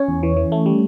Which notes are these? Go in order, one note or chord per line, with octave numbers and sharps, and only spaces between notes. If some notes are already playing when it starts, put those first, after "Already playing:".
Already playing: C#4 C#5
E2
E3
E3
A3
G3